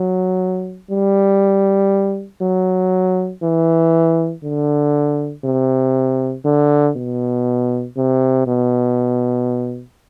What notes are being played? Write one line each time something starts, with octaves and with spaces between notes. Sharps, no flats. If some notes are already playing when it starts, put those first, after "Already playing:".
Already playing: F#3
G3
F#3
E3
D3
C3
D3
B2
C3
B2